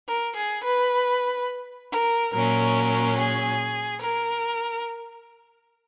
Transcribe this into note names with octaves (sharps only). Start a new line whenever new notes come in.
A#4
G#4
B4
A#4
A#2 F#3 C#4 A#4
G#4
A#4